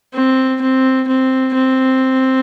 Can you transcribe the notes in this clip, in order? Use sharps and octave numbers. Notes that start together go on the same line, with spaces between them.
C4
C4
C4
C4